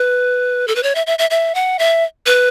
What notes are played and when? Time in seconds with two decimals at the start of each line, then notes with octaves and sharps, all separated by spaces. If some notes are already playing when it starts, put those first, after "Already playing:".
Already playing: B4
0.68 A4
0.76 B4
0.83 C#5
0.95 E5
1.07 E5
1.19 E5
1.30 E5
1.55 F#5
1.79 E5
2.26 B4